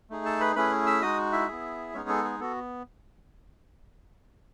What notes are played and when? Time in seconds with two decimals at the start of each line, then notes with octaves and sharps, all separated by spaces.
0.10 A3 D#4 G#4
0.25 A4 A5
0.41 B4 B5
0.56 A3 C#4 E4 G#4 B4 B5
0.86 E5 E6
1.01 G#3 D#4 F#4 D#5 D#6
1.32 E4 E5
1.48 B3 E4 G#4
1.94 G#3 B3 C#4 D#4 G#4 C#5
2.09 A4
2.24 G#4
2.40 B3 F#4 A4